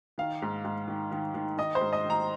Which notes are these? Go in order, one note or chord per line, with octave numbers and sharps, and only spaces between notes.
D#3 F5
G#2
G#2
D#3
D#3
D#3
D#3 D#5
C5
G#2
D#5
D#3
A#5